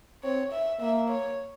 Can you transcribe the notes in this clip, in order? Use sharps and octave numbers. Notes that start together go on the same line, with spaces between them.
C4 C#5
E5
A#3 E5
C#5